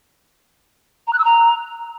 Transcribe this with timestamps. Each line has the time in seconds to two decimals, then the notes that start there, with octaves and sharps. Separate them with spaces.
1.07 A#5
1.13 F#6
1.19 E6
1.24 A#5